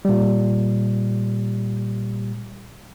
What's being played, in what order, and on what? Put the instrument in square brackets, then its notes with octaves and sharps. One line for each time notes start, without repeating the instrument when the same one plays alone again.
[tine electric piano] A#2 G3